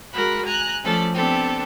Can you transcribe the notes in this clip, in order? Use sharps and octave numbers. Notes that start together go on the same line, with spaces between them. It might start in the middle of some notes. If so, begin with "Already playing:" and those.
G#3 F#4 A#4 B5 F#6
G#5 A#5 F#6
F3 A3 C#4 A4 D5
B3 C4 D4 G4 A4